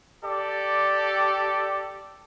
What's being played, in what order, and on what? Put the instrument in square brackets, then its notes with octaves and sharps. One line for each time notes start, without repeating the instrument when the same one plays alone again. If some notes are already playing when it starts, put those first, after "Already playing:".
[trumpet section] G4 A4 D5